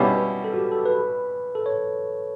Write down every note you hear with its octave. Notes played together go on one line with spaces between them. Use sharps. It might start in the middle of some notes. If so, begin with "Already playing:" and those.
Already playing: B2 G3 C#4 E4 F#5
B4
A4
F#4
G4
A4
B4
A4
C#5